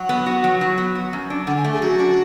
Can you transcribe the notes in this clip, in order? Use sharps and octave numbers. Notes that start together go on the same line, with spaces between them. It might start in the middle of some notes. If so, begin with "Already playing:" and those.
Already playing: F#3 F#5
B3
F#4
F#3
F#3
B3
F#4
F#2
D4
D3 F#5
G#5
A3
G#4
F#2 F#4
D4